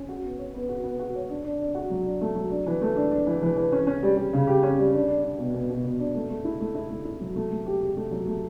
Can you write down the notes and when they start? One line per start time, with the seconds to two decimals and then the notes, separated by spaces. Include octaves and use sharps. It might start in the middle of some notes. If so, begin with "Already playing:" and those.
Already playing: C#4
0.09 F#4
0.23 B3
0.38 C#5
0.54 B3
0.69 F#4
0.84 B3
1.00 F#4
1.15 C#5
1.29 D4
1.44 D4
1.60 D4
1.75 F#4
1.90 F#3
2.05 D4
2.21 A3
2.35 F#3
2.51 D4
2.67 E3
2.82 A3
2.96 D4
3.11 D4
3.27 E3
3.42 E3
3.56 E3
3.72 C#4
3.87 C#4
4.03 G3
4.17 G3
4.33 C#3
4.47 G4
4.63 C#4
4.79 G3
4.94 D4
5.08 D4
5.24 D4
5.38 B2
5.54 B2
5.70 B2
5.84 B2
5.99 D4
6.15 A3
6.30 A3
6.45 E4
6.60 A3
6.75 E4
6.90 A3
7.05 E4
7.20 F#3
7.36 A3
7.51 A3
7.66 G4
7.81 G4
7.97 A3
8.11 F#3
8.27 A3